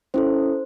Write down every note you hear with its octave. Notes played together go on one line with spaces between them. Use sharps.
C#4 E4 A4 C5